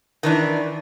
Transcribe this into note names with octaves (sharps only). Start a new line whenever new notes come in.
D#3 E3 D4